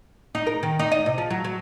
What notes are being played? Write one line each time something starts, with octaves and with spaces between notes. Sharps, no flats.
D#4
A#4
D#3
D#4
D#5
C3
F3
F#3
F#3